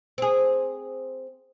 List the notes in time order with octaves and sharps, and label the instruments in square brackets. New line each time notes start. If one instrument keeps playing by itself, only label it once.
[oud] C4 G#4